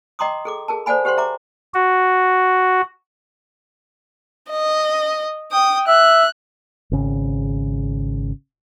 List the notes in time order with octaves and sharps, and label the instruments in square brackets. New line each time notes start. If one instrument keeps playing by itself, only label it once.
[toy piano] D#5 G5 A#5 C6 D6 D#6
G#4 A4 D6
G#4 A#4 A5
A4 C5 D5 F#5 G#5 B5
G4 C5 F#5 G5 C6
E5 A#5 D6
[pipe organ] F#4
[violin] D#5
G5 D#6
[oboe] E5 [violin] F#6
[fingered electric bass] G#1 C#3